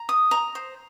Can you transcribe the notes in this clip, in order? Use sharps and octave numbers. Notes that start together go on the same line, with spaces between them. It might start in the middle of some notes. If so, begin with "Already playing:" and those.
Already playing: A#5
D#6
A#5
C5